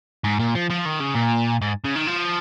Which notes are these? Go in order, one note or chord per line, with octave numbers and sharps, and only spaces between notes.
G#2
A#2
F3
F3
D#3
C#3
A#2
G#2
C#3
D#3
F3